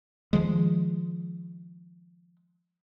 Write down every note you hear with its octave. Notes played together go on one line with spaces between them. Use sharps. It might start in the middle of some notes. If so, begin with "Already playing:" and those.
D#3 F3 G#3